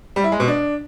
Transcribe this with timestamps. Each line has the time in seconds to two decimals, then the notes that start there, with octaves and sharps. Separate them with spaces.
0.16 G3
0.24 E4
0.32 G#3
0.40 B2
0.48 D4